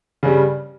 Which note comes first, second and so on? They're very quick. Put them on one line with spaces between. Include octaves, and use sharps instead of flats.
C#3 G2 G3